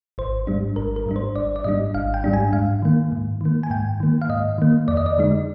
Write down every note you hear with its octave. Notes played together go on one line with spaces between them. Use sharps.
G#1 C5
G#2 G3 D4
G#1 A#4
A#4
G#2 G3 D4
C5
G#1 D5
D5
G#2 G3 D4 D#5
G#1 F5
G5
G#2 G3 D4
G#5
G#2 F5
D#3 A#3
G#2
D#3 A#3
G#5
G#2 G5
D#3 A#3
F5
G#2 D#5
D#3 A#3
F2 D5
D#5
D5
D3 G#3 D#4